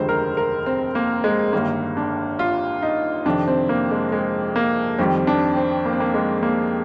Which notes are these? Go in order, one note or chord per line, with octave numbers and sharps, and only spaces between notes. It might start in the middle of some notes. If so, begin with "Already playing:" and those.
Already playing: F1 D#2 D3 F3 G#3 C5
A#4
A#4
C4
A#3
G#3
G1 G2 D#3 A#3
D4
F4
D#4
F2 C3 D#3 D4
C4
A#3
G#3
G#3
A#3
F2 D#3 G3 C4
D4
C4
A#3
C4
A#3
G#3
A#3